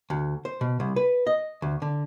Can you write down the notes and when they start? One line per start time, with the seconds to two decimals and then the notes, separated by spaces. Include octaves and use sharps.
0.10 D2
0.45 C5
0.61 B2
0.80 C2
0.96 B4
1.27 D#5
1.62 D2
1.82 D3